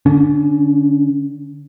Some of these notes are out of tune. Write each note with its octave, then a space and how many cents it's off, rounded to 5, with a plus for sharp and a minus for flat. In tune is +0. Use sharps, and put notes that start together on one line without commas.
D3 +0 C#4 +25